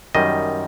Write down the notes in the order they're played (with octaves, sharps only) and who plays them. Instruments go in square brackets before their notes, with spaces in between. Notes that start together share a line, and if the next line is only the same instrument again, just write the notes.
[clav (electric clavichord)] F#2 D#3 G3 D#5